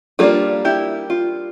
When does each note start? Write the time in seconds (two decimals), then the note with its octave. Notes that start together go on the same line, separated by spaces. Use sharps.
0.19 G3 A#3 D4 F4 A4
0.65 E4 G4
1.10 F4